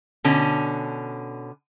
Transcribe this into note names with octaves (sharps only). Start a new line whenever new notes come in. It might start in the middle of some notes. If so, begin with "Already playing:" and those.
B2 D3 C#4